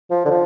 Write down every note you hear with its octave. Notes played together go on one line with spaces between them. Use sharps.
F3
D3
F3